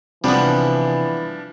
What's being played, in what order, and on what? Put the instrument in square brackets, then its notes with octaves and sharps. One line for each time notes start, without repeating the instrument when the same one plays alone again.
[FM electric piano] C3 [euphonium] E3 [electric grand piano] F3 D4 [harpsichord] G3 B3